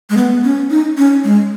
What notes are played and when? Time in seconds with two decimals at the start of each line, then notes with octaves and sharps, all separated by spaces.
0.10 G#3
0.17 B3
0.44 C#4
0.70 D#4
0.97 C#4
1.24 G#3